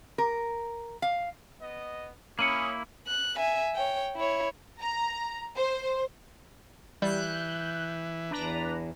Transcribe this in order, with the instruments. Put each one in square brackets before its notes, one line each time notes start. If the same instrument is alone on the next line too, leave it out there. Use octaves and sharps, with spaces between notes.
[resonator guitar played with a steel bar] A#4
F5
[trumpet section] B3 D#5
[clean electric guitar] A#3 E4 [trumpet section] C#4 [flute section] B5 D#6 [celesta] C#7 D#7 F#7
[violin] F#6
E5 G#5
C#5 G5
E4 C#5
[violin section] A#5
C5
[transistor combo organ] E3 [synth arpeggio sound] G3 [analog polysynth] F#6 G6
[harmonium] E2 [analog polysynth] D4 B4 A#5